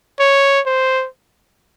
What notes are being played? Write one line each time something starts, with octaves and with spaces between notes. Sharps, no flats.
C#5
C5